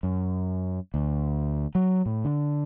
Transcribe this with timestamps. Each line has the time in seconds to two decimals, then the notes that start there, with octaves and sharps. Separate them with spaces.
0.03 F#2
0.94 D2
1.75 F#3
2.06 A2
2.25 D3